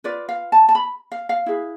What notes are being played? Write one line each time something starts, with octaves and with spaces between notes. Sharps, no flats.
F4 B4 D5
F5
A5
A5
B5
F5
F5
E4 G#4 B4